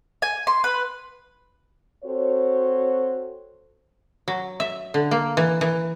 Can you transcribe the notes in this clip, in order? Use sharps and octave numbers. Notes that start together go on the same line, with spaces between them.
G#5
C6
B4
C4 F#4 A4 C5 C#5
F#3
E5
D3
A#3
E3
E3